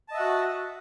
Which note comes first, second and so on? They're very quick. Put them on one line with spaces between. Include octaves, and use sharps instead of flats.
A5 D#5 E5 F#5 F#4